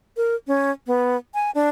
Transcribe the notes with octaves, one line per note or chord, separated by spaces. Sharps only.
A#4
C#4
B3
G#5
D4